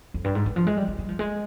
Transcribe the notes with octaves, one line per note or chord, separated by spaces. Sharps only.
F2
G2
G#2
D#3
F3
G#3
G3
G3
G3
F3
G#3